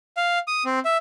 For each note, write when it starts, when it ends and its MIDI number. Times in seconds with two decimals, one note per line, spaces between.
0.17 0.39 77
0.48 0.63 87
0.65 0.79 60
0.85 0.97 76